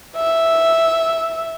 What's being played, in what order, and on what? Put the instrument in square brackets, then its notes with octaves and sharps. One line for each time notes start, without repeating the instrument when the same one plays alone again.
[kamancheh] E5